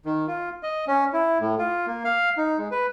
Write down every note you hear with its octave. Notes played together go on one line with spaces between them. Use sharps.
D#3
F4
D#5
C#4
E4
A2
F4
A#3
F5
D#4
G#3
B4